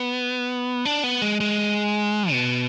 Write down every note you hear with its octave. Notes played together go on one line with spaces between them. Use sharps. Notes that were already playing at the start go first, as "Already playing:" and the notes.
Already playing: B3
D4
B3
G#3
G#3
B2